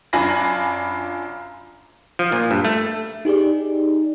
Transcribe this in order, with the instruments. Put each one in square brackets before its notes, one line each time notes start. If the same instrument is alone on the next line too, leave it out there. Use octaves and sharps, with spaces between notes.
[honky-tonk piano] F#2 D4 F4 G#5 B5 A#6
[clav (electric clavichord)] F3
A#2
G2
A3
[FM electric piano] D#4 G4 G#4 D5